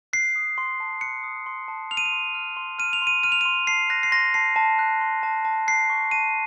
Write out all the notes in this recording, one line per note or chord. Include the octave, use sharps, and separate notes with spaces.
F#6 C7
D#6
C6
A5
F#6 C#7
D#6
C6
A5
F6 F7
D#7
F7
C6
F6
C6
F6 D#7
F7
C6 D#7
F6 D#7
F7
C6 D#7
A5 C7
F#6 A#6
C7
C6 A#6
A5 C7
A5
F#6
C6
A5
A5
F#6 C7
C#6
A5 D#7